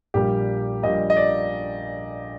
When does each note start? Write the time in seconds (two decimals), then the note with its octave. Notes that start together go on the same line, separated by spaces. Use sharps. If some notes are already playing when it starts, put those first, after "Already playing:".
0.14 A#1 A#2 G3 A#3 G4
0.83 A#1 A#2 G3 A#3 D#5
1.10 D#5
1.17 D5